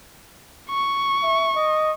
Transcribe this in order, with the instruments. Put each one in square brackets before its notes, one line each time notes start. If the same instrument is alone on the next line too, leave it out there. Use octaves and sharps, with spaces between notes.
[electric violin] C#6
[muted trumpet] E5
D#5